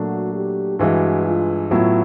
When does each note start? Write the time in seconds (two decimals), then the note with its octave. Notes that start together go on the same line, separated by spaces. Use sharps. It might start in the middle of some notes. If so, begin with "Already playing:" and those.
Already playing: A#2 F#3 A3 D4 F#4
0.32 G4
0.78 G2 E3 G#3 F#4
1.25 F4
1.71 A2 F#3 B3 E4 F4